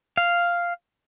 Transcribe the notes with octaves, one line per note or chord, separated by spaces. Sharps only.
F5